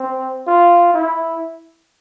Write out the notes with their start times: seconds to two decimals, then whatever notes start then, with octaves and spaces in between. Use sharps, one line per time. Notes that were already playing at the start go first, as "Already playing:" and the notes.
Already playing: C4
0.47 F4
0.94 E4